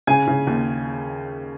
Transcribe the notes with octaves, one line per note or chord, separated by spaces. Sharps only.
C#3 G#5
C#3
D#2